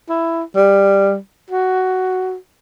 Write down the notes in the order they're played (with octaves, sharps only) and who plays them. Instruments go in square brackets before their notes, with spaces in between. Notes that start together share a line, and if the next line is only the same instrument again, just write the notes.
[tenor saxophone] E4
G3
F#4